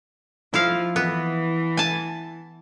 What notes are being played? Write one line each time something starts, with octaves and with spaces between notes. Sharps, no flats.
F3 E4 F5
E3 B3
G#5 A5